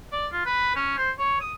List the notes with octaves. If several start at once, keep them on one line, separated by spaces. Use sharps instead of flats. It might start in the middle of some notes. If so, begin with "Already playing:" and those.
D5
F4
B4
C#4
C5
C#5
D#6